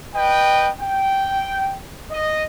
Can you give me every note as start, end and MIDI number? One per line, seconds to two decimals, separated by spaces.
0.15 0.70 71
0.15 0.70 75
0.15 0.70 79
0.80 1.78 79
2.11 2.43 75